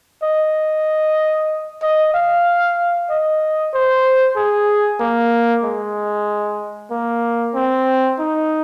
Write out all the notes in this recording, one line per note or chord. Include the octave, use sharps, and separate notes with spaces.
D#5
D#5
F5
D#5
C5
G#4
A#3
G#3
A#3
C4
D#4